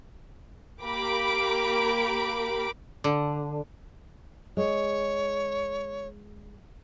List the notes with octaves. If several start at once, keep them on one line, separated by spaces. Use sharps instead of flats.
A#3 G4 A#4 B5 D6 D7
D3
G#3 C#5